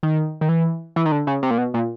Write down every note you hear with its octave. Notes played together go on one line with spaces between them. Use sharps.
D#3
D#3
E3
E3
D#3
D3
C#3
C3
A#2
B2
A#2